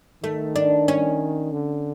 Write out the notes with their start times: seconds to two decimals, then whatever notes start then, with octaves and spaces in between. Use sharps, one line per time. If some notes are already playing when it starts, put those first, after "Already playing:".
0.23 D#3 A3
0.56 D4
0.88 C#4
1.52 D3